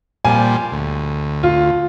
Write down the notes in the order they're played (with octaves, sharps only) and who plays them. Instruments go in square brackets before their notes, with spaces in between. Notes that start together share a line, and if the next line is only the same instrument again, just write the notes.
[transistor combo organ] A#2 F3 G3 [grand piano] G#5
[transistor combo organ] D2
[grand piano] F4